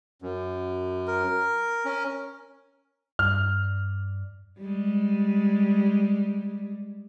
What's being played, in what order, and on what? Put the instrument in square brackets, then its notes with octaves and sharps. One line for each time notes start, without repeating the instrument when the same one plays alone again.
[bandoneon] F#2
[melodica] A#4
[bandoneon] C#4
[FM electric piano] G2 [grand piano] F6
[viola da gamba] G3 G#3